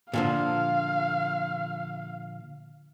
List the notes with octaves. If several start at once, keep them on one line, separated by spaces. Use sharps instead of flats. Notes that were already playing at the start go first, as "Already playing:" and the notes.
A#2 D3 F3 F5